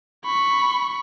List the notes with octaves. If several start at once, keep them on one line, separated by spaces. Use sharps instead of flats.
B5 C#6